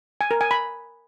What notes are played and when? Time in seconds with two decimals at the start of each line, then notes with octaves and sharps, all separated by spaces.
0.21 G#5
0.31 A#4
0.41 G#5
0.51 B5